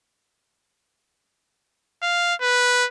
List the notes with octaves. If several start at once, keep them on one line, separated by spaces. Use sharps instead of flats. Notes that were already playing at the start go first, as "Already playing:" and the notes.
F5
B4